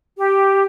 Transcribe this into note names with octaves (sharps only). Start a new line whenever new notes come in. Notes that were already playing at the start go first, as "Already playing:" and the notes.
G4